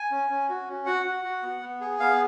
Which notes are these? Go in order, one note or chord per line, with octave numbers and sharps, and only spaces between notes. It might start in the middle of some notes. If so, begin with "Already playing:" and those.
Already playing: G#5
C#4
C#4
F#4
C#4
F#4 F#5
F#4
F#4
B3
B3
G#4
B3 F5